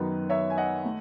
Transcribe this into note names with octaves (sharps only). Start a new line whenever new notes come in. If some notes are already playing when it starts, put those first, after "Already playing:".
Already playing: F#2 D#3 F#3 B3 B4
C#5 E5
G#5
D#5 F#5
A3